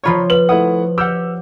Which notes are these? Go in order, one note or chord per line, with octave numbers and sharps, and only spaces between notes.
F3 F4 C#5 A#5 B5 C#6
B4 F#7
A3 E4 F#5 D#6
G4 F#5 E6 F6 G6